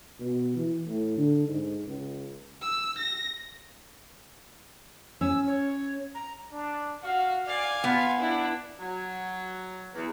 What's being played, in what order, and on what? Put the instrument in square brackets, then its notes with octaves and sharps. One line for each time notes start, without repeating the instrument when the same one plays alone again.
[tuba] B2
E3
A2
D3
G#2
C#2
[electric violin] E6
A#6
[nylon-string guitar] C#4 [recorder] E6
[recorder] C#5
A#5
[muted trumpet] D4
[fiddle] F#4 [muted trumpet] F5
[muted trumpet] D5 [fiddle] F5 G#5
[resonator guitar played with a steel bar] B3 [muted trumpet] F4
[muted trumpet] D4 [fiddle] E4
[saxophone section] F#3
E2